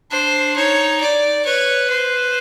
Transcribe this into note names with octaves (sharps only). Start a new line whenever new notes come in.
D4 C5
D#4 C#5
D5
B4 C#5
C5